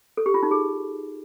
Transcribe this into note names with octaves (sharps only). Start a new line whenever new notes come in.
A4
G4
F4
D#4
G#4